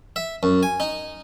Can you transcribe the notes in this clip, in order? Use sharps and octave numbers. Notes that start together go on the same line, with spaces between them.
E5
F#2
G#5
D#4